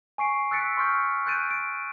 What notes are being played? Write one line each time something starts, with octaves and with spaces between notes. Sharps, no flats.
G#5 C#6 C7 D7
E6 F#6 A6 B6 C#7 D7
C6 C#6 F6 G6 C#7
C6 F#6 G6 A6 D7 D#7
D7